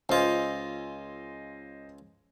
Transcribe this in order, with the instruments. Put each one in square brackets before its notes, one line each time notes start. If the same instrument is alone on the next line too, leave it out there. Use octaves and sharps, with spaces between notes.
[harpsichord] C#2 F4 [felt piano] C5 D#5 G#5